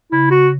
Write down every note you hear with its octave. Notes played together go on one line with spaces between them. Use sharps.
C#3 E4
F#4